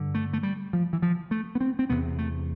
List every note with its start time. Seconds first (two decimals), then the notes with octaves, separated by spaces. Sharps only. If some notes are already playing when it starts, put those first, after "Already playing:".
Already playing: G2 D3
0.15 A3
0.33 A3
0.43 G3
0.73 F3
0.93 E3
1.02 F3
1.31 A3
1.55 B3
1.61 C4
1.79 C4
1.90 E2 C3 B3
2.18 A3